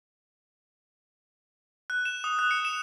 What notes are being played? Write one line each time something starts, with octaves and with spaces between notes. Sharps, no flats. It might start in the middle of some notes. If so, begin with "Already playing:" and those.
F#6
E7
D#6
F#6
C#7
E7